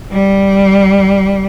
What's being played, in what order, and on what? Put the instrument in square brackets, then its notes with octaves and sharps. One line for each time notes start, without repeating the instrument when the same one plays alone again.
[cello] G3